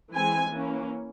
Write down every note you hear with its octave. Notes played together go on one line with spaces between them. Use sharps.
E3 G#3 C4 G#5
E3 A#3 C#4